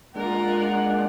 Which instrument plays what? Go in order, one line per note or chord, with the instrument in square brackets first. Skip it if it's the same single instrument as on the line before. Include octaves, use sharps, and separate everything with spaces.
[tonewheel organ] G#3 D4 [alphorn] A#3 [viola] F4 A#4 [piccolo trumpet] F#5